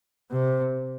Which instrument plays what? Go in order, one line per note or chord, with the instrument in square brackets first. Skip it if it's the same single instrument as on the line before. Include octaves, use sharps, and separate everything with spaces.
[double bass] C3